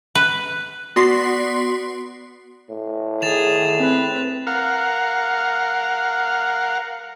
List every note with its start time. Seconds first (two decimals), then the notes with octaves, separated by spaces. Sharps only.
0.15 B4
0.96 B3 F#4 D5 C6 B6 C7
2.70 A2
3.22 D#3 G#4 A6 E7 F7
3.80 C4 B4
4.47 A#4 F5 F#5